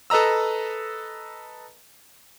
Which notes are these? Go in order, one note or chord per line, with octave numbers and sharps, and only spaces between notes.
A4 B4 D#5 A#5 E6